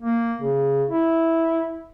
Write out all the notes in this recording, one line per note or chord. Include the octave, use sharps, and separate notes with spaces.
A#3
C#3
E4